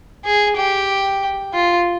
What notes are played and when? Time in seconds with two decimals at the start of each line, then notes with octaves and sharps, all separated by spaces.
0.25 G#4
0.57 G4
1.53 F4